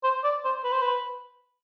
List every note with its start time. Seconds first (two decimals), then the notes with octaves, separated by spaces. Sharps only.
0.04 C5
0.24 D5
0.45 C5
0.64 B4
0.72 C5
0.82 B4